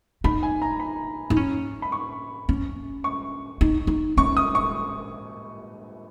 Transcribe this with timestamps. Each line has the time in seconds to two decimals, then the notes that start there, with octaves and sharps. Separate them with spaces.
0.24 D#4 B5
0.43 G#5
0.62 A#5
0.80 B5
1.30 D#4
1.36 C#4
1.82 B5
1.92 C#6
2.49 C#4
3.04 C#6
3.61 D#4
3.87 D#4
4.17 C#4 C#6
4.37 D#6
4.55 C#6